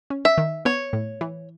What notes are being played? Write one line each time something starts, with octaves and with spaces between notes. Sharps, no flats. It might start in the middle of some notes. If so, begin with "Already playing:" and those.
C#4
E5
D#3
B3 C#5
A2
E3